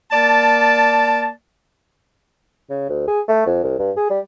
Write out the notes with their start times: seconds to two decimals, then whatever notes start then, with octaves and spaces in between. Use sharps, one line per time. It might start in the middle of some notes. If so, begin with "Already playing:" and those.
0.10 A#3 D5 A5
2.70 C#3
2.89 D2
3.08 G#4
3.28 A3
3.46 F2
3.64 C2
3.79 G2
3.97 G#4
4.10 G3